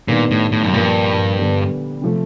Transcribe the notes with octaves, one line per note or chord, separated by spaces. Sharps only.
A#2 D#3 G3 B3 D4
A2
A2
F#2
G2 A#2 F3 A#3
D3 G3 B3
C3 F3 A3